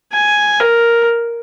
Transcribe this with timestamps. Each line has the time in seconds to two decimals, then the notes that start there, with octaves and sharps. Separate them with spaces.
0.14 G#5
0.61 A#4